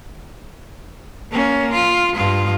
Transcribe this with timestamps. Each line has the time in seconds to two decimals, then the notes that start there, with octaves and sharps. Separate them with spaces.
1.31 A#3 C#4
1.72 F4
2.16 G2 F4